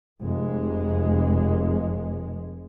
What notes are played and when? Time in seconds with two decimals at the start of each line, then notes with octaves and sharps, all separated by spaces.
0.22 F1 G#3